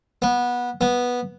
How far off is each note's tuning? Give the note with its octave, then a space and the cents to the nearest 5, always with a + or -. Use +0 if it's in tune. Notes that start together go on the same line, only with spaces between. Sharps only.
B3 -20
B3 -10